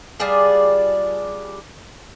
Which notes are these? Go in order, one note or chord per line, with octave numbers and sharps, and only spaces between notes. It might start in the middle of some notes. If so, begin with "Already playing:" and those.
G3 D4 F4 G#4